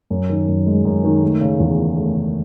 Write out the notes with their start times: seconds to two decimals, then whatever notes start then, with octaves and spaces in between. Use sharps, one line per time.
0.10 F#2
0.29 D#3
0.48 F#2
0.66 G#3
0.85 F#2
1.04 D#3
1.22 A3
1.41 C#3
1.60 E2
1.78 E3
1.97 A3
2.16 C#3